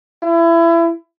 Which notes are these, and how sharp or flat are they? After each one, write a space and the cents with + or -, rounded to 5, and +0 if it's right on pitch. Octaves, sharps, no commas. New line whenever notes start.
E4 +25